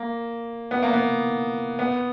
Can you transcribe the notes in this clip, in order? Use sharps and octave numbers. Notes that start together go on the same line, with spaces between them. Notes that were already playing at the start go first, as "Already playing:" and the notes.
Already playing: A#3
B3
A#3
B3
B3